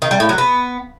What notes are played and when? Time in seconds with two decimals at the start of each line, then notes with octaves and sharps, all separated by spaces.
0.02 D#3
0.11 G3
0.20 A2
0.29 F#3
0.38 B3